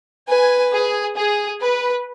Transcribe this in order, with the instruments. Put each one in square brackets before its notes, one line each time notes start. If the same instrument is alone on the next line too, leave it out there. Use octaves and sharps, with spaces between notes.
[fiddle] B4 [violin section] G#5
[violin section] G#4
G#4
B4